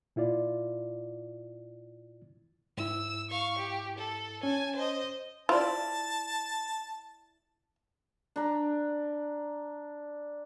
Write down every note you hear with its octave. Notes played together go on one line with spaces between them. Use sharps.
A#2 E4 F4 D5
G#2 E4 E6
F5 C#6
G4
A4
C#4 G#5 A5
C5 D#5
E4 F4 C5 D5 A5
D4 A#5